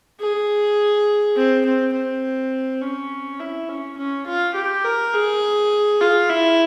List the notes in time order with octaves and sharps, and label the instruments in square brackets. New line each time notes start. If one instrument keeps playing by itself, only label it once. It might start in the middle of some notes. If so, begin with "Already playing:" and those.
[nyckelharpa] G#4
C4
C4
C4
C#4
E4
C#4
C#4
F4
G4
A#4
G#4
F4
E4